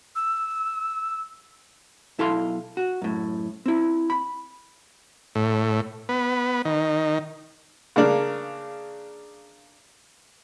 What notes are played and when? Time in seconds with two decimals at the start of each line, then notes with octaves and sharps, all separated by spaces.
0.16 E6
2.19 B1 E4 A4 F5 C6
2.77 F#4
3.02 F#2 A2
3.66 C4 E4
4.10 B5
5.35 A2
6.09 B3
6.65 D#3
7.96 C#3 A#3 D4